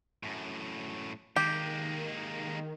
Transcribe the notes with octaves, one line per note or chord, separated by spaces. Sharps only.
F#2 A2
D#3 G#3 A#3 G4